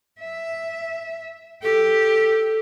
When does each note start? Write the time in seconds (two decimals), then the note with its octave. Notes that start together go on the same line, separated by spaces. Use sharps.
0.20 E5
1.63 G4 A4